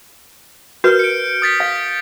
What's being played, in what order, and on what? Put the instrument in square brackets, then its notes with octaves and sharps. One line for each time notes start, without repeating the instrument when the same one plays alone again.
[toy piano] F#4 A#4 B4 [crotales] F6 G6
[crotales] C#7 D7
D#6 A6 B6
[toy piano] F5